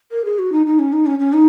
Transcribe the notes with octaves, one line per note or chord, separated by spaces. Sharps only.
A#4
G#4
F#4
D#4
D#4
C#4
D#4
C#4
C#4
D#4